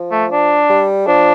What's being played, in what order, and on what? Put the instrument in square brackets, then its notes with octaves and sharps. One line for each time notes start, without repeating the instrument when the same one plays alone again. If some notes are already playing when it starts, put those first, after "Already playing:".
Already playing: [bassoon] F3
[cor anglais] A3
D4
[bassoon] G3
[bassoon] F3 [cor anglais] D4